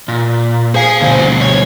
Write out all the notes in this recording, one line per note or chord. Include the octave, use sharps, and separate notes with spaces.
A#2
G#4 C5 F5 G#5
D2 B2 A#3 C5
C#5